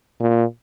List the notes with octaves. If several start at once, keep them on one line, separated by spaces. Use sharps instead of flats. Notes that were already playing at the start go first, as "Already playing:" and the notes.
A#2